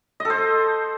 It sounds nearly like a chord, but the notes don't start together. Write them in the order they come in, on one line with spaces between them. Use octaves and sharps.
D#5 A4 C5